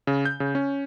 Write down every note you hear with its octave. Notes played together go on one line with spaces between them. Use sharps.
C#3
G6
C#3
C#4